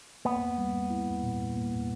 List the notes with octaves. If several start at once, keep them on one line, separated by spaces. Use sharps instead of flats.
A#3 B3
G3
E4
A#2
A#3